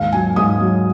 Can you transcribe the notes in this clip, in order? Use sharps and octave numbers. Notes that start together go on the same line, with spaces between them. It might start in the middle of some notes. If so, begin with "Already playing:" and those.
Already playing: D#2 G#2 F5
F#3 G#5
G#2 D#6
F#3